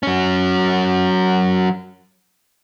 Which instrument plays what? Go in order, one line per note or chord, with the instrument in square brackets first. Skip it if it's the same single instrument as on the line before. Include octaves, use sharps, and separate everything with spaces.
[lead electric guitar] F#3 C#4